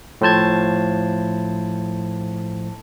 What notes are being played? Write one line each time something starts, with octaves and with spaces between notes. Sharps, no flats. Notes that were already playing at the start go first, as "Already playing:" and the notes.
A2 F3 C5 A5 G#6